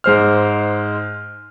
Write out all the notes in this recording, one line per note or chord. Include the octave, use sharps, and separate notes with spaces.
G#2 G#3 C5 F6